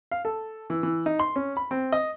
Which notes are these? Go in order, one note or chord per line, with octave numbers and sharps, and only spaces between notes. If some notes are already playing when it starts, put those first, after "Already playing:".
F5
A4
E3
E3
D#4
C6
C#4
B5
C4
D#5